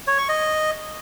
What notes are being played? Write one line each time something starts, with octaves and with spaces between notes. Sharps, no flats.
C#5
C#6
D#5